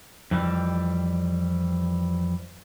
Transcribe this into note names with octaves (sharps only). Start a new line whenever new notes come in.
F2 E3 G3